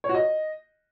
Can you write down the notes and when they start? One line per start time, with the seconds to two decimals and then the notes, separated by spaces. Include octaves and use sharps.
0.04 C#5
0.09 F#4
0.15 D#5